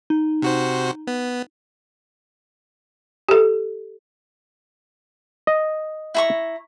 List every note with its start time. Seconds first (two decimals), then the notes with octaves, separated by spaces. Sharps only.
0.10 D#4
0.42 C3 F#4 C5
1.07 B3
3.29 G4 A4
5.47 D#5
6.15 E4 A#5 C#6